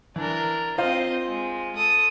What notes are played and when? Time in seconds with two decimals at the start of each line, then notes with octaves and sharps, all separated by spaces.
0.16 E3 D4 A#4
0.78 C4 F4 C5 D#5 F5
1.26 G#3
1.76 A4 D#6